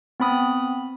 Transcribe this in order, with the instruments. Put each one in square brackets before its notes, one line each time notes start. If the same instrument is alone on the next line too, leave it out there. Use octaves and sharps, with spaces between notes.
[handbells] B3 C4 B5 D#6